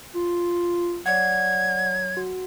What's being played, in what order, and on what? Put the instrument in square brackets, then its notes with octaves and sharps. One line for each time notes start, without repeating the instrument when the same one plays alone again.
[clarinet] F4
[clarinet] F#3 [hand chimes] D5 F#5 [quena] G#6
[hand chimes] F#4